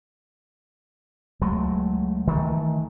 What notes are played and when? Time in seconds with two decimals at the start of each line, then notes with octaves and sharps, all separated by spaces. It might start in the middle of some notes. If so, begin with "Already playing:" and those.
1.41 C#2 F#3 G#3 A3
2.27 D#3 E3 G3 A3